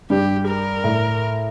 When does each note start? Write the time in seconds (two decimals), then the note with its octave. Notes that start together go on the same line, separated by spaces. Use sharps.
0.10 G2 G4
0.48 A#4
0.84 A2